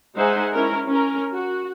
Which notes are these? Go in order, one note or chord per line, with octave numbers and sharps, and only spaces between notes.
G#3 D#4 C5 E5 F#5 G#5
C#4 E4 A#4
C#4 A#4
F#4